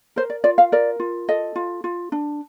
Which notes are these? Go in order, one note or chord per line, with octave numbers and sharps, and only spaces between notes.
A#4 C5
D5
F4 D5
F5
A#4 D5
F4
A4 D#5
F4
F4
D4